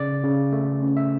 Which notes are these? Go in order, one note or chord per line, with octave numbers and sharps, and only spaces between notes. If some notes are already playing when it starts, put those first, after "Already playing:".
Already playing: C#3 D5
C#3
A3
C#4
E5